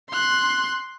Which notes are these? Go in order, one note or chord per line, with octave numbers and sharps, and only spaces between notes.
C6 F#6